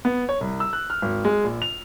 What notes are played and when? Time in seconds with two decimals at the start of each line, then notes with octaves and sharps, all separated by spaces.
0.05 B3
0.29 C#5
0.41 C2
0.60 E6
0.73 F#6
0.90 F6
1.02 G#1
1.25 G#3
1.44 A#1
1.62 F7